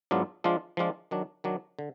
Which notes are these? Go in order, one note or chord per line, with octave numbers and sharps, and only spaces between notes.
G#2 F#3 B3 D4 F4
F3 G#3 D4 F4
F3 G#3 D4 F4
D#3 F#3 D4
D#3 F#3 D4
D3